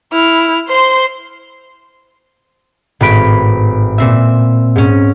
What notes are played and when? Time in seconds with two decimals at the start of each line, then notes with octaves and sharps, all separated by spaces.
0.13 E4 F6
0.68 C5 C6
3.00 G#1 A2 B4 D7
3.98 A#2 C4 E5
4.76 G#2 C#4